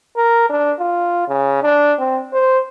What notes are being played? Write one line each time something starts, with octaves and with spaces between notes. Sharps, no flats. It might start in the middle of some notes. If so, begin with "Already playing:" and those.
A#4
D4
F4
C#3
D4
C4
C5